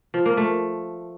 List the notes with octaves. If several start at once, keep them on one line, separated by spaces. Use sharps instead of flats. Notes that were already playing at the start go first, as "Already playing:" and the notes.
F3
A#3
A3